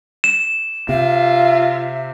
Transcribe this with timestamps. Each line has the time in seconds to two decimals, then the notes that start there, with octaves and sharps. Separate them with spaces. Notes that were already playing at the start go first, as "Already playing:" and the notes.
0.24 E7
0.89 C3 F4 E5